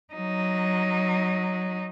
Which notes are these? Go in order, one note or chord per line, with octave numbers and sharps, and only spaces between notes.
F#3 D#4